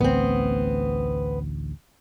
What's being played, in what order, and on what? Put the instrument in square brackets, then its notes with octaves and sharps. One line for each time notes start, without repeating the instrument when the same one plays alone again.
[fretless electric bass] A1 D2 [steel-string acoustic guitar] B3 C4